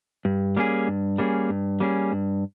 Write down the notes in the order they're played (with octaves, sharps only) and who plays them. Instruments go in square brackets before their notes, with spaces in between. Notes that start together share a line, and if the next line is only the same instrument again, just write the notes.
[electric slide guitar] G2
G3 A#3 C#4 G#4
G2
G3 A#3 C#4 G#4
G2
G3 A#3 C#4 G#4
G2